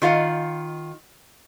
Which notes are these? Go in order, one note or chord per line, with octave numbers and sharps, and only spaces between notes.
D#3 F4 F5 F#5